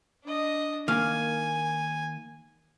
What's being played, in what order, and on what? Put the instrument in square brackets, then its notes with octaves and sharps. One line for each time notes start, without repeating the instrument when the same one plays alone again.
[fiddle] D4 D#5
[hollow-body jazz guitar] D#3 A#3 [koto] F5 [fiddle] G#5